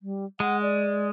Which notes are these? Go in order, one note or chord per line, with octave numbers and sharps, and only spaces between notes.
G3
G#3 F#5
D5